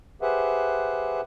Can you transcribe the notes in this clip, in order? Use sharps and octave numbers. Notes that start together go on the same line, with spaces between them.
G4 G#4 B4 C5 E5 F#5